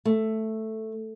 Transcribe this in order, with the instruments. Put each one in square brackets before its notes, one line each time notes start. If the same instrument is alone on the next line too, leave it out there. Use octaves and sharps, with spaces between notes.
[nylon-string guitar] A3